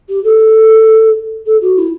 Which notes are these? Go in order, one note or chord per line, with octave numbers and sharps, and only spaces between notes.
G4
A4
A4
F#4
E4